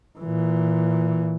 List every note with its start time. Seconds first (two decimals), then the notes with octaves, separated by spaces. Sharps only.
0.19 A#2 E3